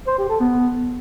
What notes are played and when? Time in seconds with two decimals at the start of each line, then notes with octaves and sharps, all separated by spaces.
0.07 C5
0.18 G4
0.29 A4
0.40 B3